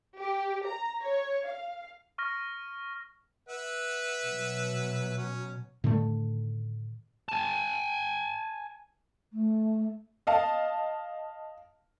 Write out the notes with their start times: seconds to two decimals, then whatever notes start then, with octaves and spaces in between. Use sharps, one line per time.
0.17 G4
0.65 A#5
1.01 C#5
1.46 F5
2.18 C#6 F6 A#6
3.49 B4 E5 F#5
4.25 B2 F#3
5.18 C#4
5.84 A2 D3 D#3 A3
7.29 G#5 A5
9.32 A3
10.27 D#5 F5 A5